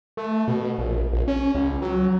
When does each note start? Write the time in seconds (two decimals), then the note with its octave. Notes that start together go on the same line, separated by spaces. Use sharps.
0.17 A3
0.48 B2
0.78 A#1
1.13 A#1
1.28 C#4
1.55 C#2
1.82 F#3